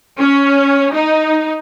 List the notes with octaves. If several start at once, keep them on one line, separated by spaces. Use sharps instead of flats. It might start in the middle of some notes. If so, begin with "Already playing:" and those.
C#4
D#4